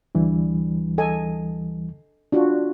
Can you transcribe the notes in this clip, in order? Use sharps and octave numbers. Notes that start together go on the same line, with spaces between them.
D2 E3 G3 D4
A4 D#5 G#5
D4 F4 F#4